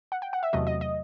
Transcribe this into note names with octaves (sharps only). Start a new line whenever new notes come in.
F#5
G5
F#5
E5
E2 C3 F#3 A3 D#5
D#5
D#5